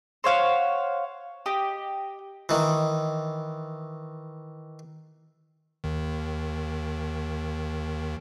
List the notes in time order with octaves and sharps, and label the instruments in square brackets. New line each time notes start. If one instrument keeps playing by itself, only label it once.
[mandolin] C5 C#5 F5 F#5
G4 D#5
[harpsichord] D#3 E3
[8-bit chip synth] D#2 D#3